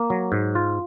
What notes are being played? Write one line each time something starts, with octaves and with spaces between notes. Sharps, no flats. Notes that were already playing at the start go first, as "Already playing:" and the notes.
Already playing: A#3
F#3
G#2
F4